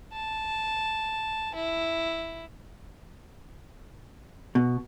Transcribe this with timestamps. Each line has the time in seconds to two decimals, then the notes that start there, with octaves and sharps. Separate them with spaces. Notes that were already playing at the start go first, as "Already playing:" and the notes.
0.13 A5
1.55 E4
4.55 B2